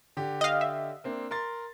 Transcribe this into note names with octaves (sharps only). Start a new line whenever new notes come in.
D3 G4
D#5 F5
E5
A#3 C4 D4
A#4 C6 A6